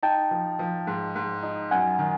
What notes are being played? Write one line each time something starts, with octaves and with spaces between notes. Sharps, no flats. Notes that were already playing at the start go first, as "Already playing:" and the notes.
D#4 G5 A5
F3
F3
G#2
G#2
D#4
F#2 F#5 G#5
D#3